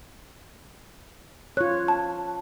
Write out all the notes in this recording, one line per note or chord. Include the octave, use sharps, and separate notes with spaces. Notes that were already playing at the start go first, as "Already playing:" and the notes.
F4 C#5 F#6
A5